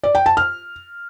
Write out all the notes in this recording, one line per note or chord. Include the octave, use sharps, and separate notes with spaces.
D5
G5
A5
F6